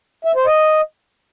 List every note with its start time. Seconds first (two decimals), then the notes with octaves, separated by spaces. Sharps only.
0.25 E5
0.35 C5
0.46 D#5